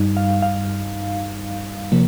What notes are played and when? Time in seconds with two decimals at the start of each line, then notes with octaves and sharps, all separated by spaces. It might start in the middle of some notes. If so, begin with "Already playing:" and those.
Already playing: G2 G3 D#4
0.17 F5
0.42 F5
1.92 C3 F3 A#3